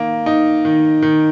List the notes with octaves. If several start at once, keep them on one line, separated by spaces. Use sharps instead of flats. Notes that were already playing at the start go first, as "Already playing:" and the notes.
Already playing: D#3 A#3
D#4
D#3
D#3